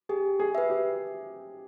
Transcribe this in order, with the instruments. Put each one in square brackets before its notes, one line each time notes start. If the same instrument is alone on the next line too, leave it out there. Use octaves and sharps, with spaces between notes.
[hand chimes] G4 [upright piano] G#4
[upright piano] G#4
[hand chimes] B4 E5
[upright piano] G4